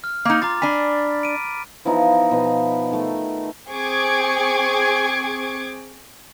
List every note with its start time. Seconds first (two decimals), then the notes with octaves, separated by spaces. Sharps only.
0.04 F6
0.25 A#3 D#4
0.42 F4 A#5 D6 A6
0.62 D4 G#5 B5 B6
1.23 D7 D#7
1.85 E3 F3 B3 D#4
2.31 B2 F3 B4
2.92 D#3 A3
3.69 C4 G#4 G5 C#6 D6 G#6